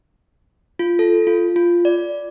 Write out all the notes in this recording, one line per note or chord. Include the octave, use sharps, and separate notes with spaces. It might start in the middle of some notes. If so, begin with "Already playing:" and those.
F4
A4
F4
F4
D5